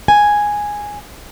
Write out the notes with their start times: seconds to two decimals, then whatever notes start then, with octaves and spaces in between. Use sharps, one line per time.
0.08 G#5